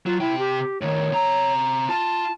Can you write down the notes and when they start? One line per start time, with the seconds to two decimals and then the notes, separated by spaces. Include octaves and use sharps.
0.06 F#3 F4
0.20 C3 E4 G5
0.39 G4
0.81 A2 D#3 C#5
1.12 C3 A#5
1.89 F4 A5